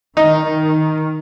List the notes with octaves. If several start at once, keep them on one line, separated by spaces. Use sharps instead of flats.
D#3 D#4